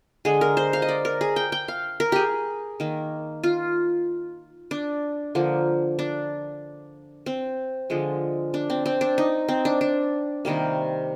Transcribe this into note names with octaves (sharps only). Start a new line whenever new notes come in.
D3 G#3 G#4
A#4
C5
F5
D#5
D5
A#4
G#4
G5
G5
F5
A#4
G4 G#4
D#3 A#3
F4
D4
D3 F3 A#3
D4
C4
D3 F3 G#3
D4
C4
C4
D4
D#4
C4
D4
D4
C3 D#3 G3 A#3